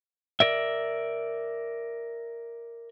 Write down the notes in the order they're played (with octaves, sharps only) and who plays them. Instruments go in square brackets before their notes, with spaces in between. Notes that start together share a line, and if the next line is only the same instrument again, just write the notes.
[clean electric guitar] A#4 D5 E5